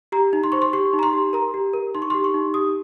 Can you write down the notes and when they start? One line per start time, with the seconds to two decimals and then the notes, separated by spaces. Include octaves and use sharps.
0.12 G4 A#5
0.33 D#4
0.43 C6
0.52 C5 C#6
0.62 C6
0.73 G4 C#6
0.93 D#4
0.99 A#5
1.03 C6
1.13 G4
1.33 A#4 A#5
1.54 G4
1.74 A#4
1.94 D#4 C6
2.02 C#6
2.10 G4 C6
2.24 C#6
2.34 D#4
2.54 G4 D#6